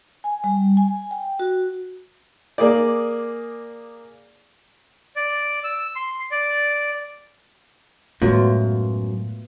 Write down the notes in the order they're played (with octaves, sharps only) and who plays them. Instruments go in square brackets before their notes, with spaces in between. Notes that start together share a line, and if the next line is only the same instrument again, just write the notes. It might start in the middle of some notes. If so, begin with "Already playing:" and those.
[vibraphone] G#5
G3
G#5
G5
F#4
[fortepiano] A#3 G#4 D5
[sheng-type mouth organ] D5
E6
C6
D5
[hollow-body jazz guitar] F#2 [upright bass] A2 G#3 [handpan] A3 B3 F4